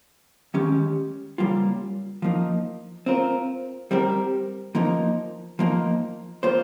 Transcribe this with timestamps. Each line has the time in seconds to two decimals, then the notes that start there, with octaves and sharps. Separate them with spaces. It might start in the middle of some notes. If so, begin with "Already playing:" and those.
0.54 D#3 G#3 C#4 G4
1.38 C#3 G3 A#3 F4
2.22 F3 A#3 D#4
3.06 C4 F4 A#4
3.91 G3 C4 G4 A#4
4.75 F3 A#3 D#4
5.59 F3 A#3 D#4
6.43 A#3 F4 C5